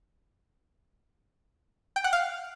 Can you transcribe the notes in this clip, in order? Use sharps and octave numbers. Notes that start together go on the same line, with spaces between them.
G5
F#5
F5